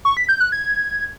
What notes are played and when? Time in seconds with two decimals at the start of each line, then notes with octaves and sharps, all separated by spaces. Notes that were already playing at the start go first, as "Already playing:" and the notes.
0.05 C#6
0.17 B6
0.29 G6
0.40 F#6
0.52 G#6